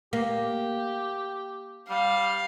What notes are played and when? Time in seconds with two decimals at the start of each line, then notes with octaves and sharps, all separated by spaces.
0.13 A#3 G4
1.90 G3 F5